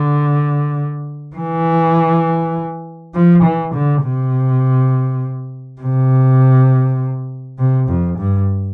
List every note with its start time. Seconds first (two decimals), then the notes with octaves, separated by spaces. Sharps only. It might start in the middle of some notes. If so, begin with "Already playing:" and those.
Already playing: D3
1.37 E3
3.15 F3
3.43 E3
3.74 D3
4.03 C3
5.82 C3
7.59 C3
7.89 F2
8.18 G2